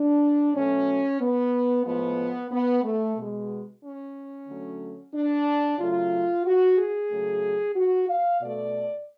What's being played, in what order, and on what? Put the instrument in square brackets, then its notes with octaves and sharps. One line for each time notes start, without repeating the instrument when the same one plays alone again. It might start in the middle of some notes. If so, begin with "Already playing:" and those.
Already playing: [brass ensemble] D4
B2 F#3 A3 C#4
B3
A2 F3 G#3 B3
B3
A3
B2 G#3
C#4
D3 F#3 A3
D4
C#3 F#3 A3 F4
F#4
G#4
C#3 F#3 A3
F#4
F5
B2 A3 D5